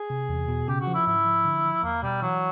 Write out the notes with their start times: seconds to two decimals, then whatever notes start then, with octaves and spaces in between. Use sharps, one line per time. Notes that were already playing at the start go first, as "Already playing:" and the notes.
Already playing: G#4
0.10 C3
0.29 E2
0.48 B2
0.68 C#3 G4
0.81 F#4
0.87 F3
0.94 E4
1.06 G#2 E4
1.25 F3
1.45 D3
1.64 F3
1.83 E2 A#3
2.03 B2 G3
2.22 E3 F#3